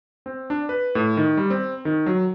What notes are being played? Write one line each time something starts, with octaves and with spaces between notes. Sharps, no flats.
C4
D4
B4
A2
D#3
G3
C4
D#3
F#3